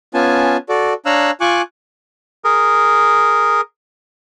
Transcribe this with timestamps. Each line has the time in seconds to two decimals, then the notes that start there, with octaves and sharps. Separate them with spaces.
0.14 B3 C#4 F4 G#5 A5
0.69 F#4 A4 D5
1.06 D4 C#5 F5 A#5 E6 F#6
1.41 F4 G#5 C#6 D6 F#6
2.44 G#4 A#4